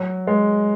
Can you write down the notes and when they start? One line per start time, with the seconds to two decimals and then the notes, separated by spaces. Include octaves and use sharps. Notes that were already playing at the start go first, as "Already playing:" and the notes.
Already playing: F#3
0.27 G#3